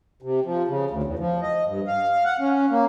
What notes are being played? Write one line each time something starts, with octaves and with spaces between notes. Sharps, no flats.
C3
F3
C#3
D2
E2
F3
D#5
G2
F5
F#5
C#4
A#3